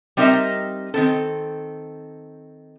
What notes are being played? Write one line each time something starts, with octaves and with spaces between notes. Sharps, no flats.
G3 C4 D#4 A#4 D#5 E5
D#3 C4 A4